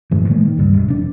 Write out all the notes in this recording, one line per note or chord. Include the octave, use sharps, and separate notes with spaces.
F#2 A2 E3
A#2 D#3 G#3 A#3
D#3
C#2 G2
E1
F1 D4